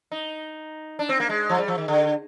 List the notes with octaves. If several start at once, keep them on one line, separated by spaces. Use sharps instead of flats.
D#4
D4
C4
A#3
G#3
F3
G3
F3
D#3
D3